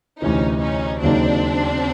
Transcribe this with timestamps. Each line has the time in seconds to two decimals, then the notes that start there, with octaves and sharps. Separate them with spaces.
0.21 D2 C3 E3 C#4 D#4
0.61 C#4 D#4
1.01 D#2 C#3 F#3 A#3 C4 D4 D#4